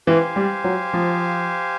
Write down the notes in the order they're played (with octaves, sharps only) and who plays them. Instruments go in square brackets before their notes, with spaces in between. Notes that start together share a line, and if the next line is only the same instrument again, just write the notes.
[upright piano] E3 [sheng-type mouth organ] G4 C5 F5 G#5
[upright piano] G3
F#3
F3